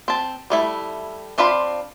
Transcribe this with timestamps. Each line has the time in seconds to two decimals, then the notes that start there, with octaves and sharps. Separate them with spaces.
0.08 C4 A5
0.50 G3 A3 E4
1.38 C4 D4 F4 F5 B5